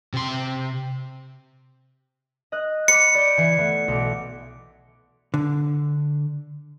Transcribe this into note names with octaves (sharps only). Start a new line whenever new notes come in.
C3 C6
D#5 F#6
B5 D6 C#7
D5 G6
E3 G#5 C7
E3 A3 B3
B1 D6
D3